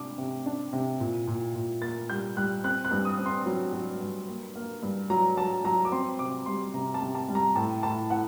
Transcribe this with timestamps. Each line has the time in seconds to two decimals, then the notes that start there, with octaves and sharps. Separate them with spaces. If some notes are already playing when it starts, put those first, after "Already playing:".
Already playing: C3 D4 D6
0.18 C3
0.46 D4
0.73 C3
1.00 A#2
1.27 A#2
1.55 A#2
1.82 A#3 A6
2.10 G3 G6
2.37 G3 F#6
2.64 C4 F#6
2.85 F#6
2.91 G2
3.05 D#6
3.18 C4
3.26 C6
3.46 F#3
3.73 F#3
4.01 G2
4.28 A#3
4.55 A#3
4.82 G2
5.10 F#3 A#5
5.37 F#3 A5
5.64 F#3 A#5
5.85 D6
5.92 C4 C6
6.19 C3 D6
6.46 G3 C6
6.74 C3 A#5
6.94 A5
7.01 C3
7.15 A5
7.29 G3
7.35 A#5
7.55 A2 A5
7.83 A2 A5
8.10 A2 F#5